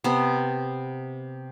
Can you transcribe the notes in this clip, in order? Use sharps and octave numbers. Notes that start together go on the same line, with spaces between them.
C3 B3